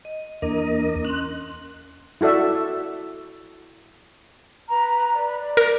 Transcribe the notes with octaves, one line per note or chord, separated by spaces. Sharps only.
D#5
E2 A#3 D4 A#4 D#5
C#4 C6 F#6
E4 F#4 A4 D5 E5
B4 A#5
B4 D5
D5
A#4